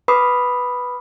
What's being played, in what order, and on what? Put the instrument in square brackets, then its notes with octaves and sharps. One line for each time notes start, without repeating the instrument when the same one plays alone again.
[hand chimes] B4 B5 D6 D#6 C7